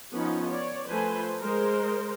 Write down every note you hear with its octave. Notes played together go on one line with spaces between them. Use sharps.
F3 B3 C#4 D#4
C#5 D5
F3 A3 B4 C5 G#5 A5
G#3 A#4 C5